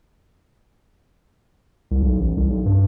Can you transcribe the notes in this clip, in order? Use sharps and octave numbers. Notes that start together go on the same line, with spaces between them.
C2
B1
A1
C2
B1
G2